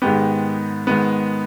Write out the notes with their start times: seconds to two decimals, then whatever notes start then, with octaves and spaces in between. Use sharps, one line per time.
0.02 G#2 D#3 G#3 B3 G4
0.87 G#2 D#3 G#3 B3